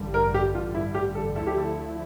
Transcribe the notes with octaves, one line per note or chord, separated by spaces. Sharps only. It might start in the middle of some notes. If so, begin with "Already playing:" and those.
Already playing: A1 G2 D3 G3
A#4
G4
A1 G2 D3 G3 F4
E4
G4
A4
D2 D3 F3 A3 E4 A4
G4
A4